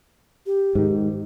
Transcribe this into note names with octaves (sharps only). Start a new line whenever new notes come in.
G4
G#2 D#3